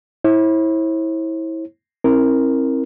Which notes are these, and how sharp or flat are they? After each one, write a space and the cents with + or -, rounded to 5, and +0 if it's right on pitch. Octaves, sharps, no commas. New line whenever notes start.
E4 -20 C5 +45
C4 +35 E4 -20 A#4 +0